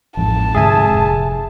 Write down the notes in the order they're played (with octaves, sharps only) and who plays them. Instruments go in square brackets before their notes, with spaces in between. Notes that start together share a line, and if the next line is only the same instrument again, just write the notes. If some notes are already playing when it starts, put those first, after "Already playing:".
[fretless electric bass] A1 F2 G#2 [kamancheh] A5
[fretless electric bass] D2 G#2 C3 [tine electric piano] G#4 E5 G#5
[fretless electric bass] F1